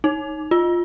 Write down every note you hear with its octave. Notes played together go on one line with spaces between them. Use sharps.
D#4
F4